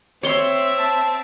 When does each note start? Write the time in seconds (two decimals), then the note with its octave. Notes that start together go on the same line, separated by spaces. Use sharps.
0.23 C4 C#5 E5 C6
0.79 A5